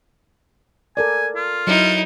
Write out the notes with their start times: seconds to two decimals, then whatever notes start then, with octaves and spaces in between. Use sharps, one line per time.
0.97 A4 A#4 D5 G#5
1.36 F4
1.67 F#3 D#4 E4